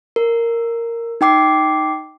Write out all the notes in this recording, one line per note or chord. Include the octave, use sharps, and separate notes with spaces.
A#4
D#4 G5 D6 C7